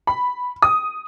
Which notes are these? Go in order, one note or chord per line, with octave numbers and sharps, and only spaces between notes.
B5
D#6